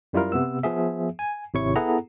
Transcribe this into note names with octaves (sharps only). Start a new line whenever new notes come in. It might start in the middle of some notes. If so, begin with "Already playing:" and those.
F#2 G3 E4 F4 A#4
C3 B3 E6
F3 B3 G#4 E5
G#5
G#1 C3 E4 C#5 C#6
B3 E4 G#4 A4 F#5 A#5